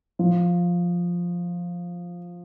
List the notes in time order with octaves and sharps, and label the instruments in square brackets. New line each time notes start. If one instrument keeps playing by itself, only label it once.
[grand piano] F3